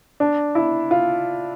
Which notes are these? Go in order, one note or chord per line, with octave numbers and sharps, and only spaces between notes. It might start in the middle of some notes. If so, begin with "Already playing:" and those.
D4
E4
F4